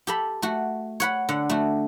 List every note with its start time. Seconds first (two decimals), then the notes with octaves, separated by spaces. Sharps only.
0.07 G4 A4 B5
0.42 A3 F#4
1.00 C#5 F#5 B5
1.29 D3 F#5
1.50 A3 F#4